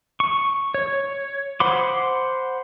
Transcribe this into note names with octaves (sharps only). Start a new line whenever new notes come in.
C#6
C#5
C5 F#5 B5 C6 D6